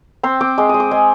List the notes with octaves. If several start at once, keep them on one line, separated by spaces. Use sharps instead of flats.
C4 C6
C4 D6
G#3 D6
G#3 D#6
D6
G#3 G#5